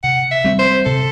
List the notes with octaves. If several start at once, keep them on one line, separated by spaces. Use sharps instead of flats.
C3 F#5
E5
G3 C4
C5
C3 A4